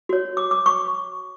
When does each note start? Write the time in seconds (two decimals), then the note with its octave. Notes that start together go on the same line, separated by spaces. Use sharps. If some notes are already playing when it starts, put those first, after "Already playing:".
0.09 F#4 C#5
0.37 D6
0.51 D6
0.66 C#6